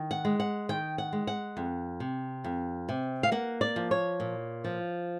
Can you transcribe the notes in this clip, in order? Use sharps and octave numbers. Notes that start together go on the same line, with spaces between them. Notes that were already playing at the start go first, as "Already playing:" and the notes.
Already playing: D#3
F#5
G#3
F#5
D#3 G5
F#5
G#3
F#5
F2
C3
F2
C3
F5
A#3 F#5
D5
F3
C#5
A#2
F3